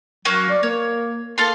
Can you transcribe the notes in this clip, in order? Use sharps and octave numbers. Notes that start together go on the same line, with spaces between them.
F#3 A#3 C#4 F#6
D5
A#3 C#5
A#3 A4 F5 C6